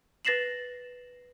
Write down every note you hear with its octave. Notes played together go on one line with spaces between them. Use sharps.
B4 A6 A#6 C7 E7 F#7